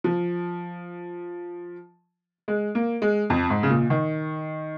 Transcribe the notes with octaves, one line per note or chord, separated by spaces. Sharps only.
F3
G#3
A#3
G#3
F2
G#2
C#3
A#2
D#3